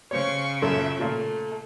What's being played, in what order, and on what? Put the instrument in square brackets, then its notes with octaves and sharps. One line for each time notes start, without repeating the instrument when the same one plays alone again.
[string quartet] C#3 [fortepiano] C5 C#5 [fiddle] F5 C#6
[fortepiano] F#2 A#2 [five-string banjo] A4 [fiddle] E5
[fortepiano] A#2 F4 [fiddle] A3